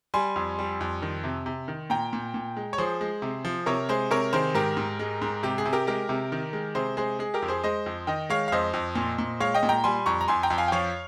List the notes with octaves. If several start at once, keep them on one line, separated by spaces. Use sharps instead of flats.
G3 G#5 C6
F2
G3
F2
D#3
C3
C3
D#3
A#2 G5 A#5
A#2
A#2
G#3
C#5
F3 G#4 C5
G#3
C3
F3
C3 A#4 C#5
G#3 G#4 C5
C3 A#4 C#5
D#3 G#4 C5
G#2 G4 A#4
G#2
G#3
G#2
C3 G4
G#4
C3
G4 A#4
G#3 G4 A#4
C3
D#3
G#3
C3 G#4 C5
G#3 G#4 C5
G#3 G#4
G4 A#4
F2
G#4 C5
G#3 C5 D#5
F2
D#3 D#5 G5
G#3 C#5 F5
F5
F2 C5 D#5
F2
A#2
A#2
G#3 C#5 F5
D#5 G5
A#2
G5 A#5
G3 G#5 C6
F2 A#5 C#6
A#5
F2 G#5 C6
G5 A#5
F2
F5 G#5
G5
F3 C#5 F5